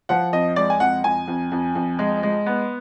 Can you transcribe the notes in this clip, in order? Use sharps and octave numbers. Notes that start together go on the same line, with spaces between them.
F3 F#5
F2 D#5
G#3 D5
G#5
F2 F#5
F2 G#5
F2
F2
F2
G#3
G#3
B3